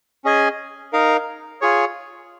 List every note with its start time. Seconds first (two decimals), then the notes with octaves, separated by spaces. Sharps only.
0.25 C#4 G#4 D#5 G#5
0.93 D#4 A#4 F5
1.61 F4 G#4 C#5